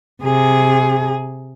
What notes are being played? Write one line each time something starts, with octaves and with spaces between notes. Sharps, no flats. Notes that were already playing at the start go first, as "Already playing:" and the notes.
C3 G#4